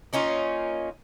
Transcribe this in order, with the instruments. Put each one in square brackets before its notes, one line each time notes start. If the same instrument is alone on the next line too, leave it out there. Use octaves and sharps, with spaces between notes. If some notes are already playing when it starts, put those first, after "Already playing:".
[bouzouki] A#3 C#4 D#4 F4